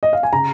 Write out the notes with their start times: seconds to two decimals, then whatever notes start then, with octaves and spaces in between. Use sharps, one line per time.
0.03 D#5
0.13 F5
0.23 G#5
0.33 C#3 A#5